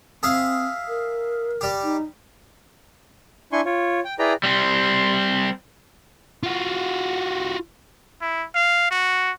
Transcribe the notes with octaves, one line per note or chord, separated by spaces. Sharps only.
C4 G#4 E5 F5
A#4
G3 G4
D#4
D4 E4 G#5 C6 C#6
F4 C#5
G5
E4 G#4 B4 D5 G5 A#5
G3 C4
F4 F#4
E4
F5
F#4